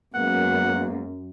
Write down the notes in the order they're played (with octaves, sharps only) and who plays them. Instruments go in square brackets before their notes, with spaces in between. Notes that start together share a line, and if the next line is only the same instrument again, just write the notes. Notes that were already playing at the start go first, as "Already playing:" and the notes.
[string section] F#2 [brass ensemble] G#3 A#3 B3 [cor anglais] F#5